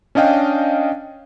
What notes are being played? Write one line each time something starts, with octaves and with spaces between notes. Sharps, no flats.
C#4 D4 D#5 F5 G5